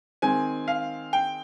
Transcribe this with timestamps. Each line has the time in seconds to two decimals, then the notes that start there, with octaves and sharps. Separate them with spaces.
0.22 D#3 G#3 C4 G#5
0.68 F5
1.13 G5